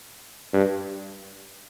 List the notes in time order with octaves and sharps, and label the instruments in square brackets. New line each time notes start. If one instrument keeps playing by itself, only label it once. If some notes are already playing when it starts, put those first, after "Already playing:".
[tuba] G2